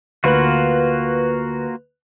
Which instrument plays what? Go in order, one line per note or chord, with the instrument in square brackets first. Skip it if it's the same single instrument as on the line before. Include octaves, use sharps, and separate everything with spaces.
[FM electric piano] D2 B4 F#6 [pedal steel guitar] A#3 F4 F#4